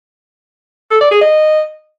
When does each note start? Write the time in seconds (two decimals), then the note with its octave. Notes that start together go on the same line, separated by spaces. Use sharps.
0.91 A4
1.01 D5
1.11 G#4
1.21 D#5